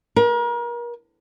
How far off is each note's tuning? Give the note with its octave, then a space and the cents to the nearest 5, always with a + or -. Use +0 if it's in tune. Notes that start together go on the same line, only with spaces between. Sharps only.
A#4 +35